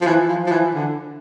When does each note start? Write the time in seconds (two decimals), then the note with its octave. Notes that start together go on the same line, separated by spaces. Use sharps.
0.01 F3
0.07 E3
0.29 F3
0.47 F3
0.52 E3
0.75 D3